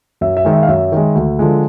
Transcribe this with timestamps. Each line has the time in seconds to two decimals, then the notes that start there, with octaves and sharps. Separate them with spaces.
0.21 F#2 E5
0.37 E5
0.45 D#3 G#3
0.53 E5
0.63 F5
0.68 F#2 E5
0.92 D#3 G#3
1.15 D2
1.39 D3 F3 G#3